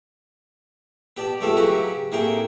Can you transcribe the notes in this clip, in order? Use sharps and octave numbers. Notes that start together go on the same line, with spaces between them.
B3 G4 D5 A5
C#2 C3 A3 B3 A4 F5
C#3 F#3 F#4 G4 B4 A#5
A2 C3 A#3 G#4 G5 A#5